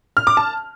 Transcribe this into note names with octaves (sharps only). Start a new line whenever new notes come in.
F6
D6
A5